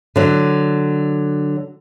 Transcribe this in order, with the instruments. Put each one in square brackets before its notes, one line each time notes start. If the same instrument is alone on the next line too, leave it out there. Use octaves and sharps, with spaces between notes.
[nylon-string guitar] D3 F#3